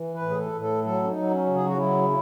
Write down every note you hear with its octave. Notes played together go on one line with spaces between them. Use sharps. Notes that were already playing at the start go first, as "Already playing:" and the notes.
Already playing: E3
B4
A2
G#4
A4
A2
A4
F#3 A4
C#4
D#4
F#3
C#4
C#3
G#4
F#4
F#3 E4